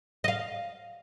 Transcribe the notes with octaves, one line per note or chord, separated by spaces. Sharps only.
D#5 F5